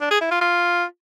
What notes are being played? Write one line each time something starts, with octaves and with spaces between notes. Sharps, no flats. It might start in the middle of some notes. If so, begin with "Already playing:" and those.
D4
G#4
E4
F4
F4